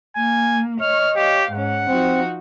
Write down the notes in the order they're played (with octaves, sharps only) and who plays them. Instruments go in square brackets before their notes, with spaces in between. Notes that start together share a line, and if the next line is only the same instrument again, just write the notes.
[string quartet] A#3 [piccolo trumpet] G#5
[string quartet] C#5 [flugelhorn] D#5 [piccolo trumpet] F6
[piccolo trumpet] G4 [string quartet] C#5 F5
[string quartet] G#2 C#4 [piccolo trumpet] F#5
[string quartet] F3 D#4 F#4 [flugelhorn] C4